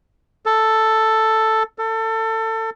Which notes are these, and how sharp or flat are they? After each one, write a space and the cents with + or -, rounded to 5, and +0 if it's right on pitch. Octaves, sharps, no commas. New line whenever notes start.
A4 +5
A4 +25